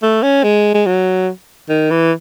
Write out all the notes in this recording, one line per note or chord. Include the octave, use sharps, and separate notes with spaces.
A3
C#4
G#3
G#3
F#3
D#3
E3